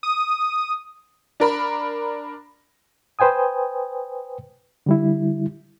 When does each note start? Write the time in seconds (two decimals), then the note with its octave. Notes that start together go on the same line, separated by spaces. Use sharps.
0.03 D#6
1.40 D4 A#4 B5
3.19 B4 C5 G5 G#5 D#6
4.86 D3 G3 E4